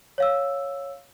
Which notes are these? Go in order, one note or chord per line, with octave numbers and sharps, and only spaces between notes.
C#5 F5 E6